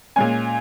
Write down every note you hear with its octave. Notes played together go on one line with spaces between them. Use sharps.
A#2 G#3 C#4 G#5